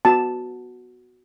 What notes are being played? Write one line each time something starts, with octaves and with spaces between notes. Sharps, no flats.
B3 F#4 A5